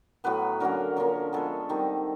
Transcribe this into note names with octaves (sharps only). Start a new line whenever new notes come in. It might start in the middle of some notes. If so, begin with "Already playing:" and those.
A2 F#3 B3 B4
D3 F#3 A#3 C#4 A#4
D3 F3 A#3 C#4 A#4
F3 G#3 B3 A4
D#3 G3 C4 D#4